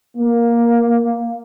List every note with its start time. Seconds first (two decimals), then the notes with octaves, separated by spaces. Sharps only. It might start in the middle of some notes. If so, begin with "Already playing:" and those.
0.17 A#3